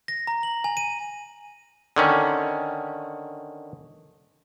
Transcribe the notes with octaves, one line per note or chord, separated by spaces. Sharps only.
A#6
A#5
F#7
G#5
D#7
D3 D#3 C#4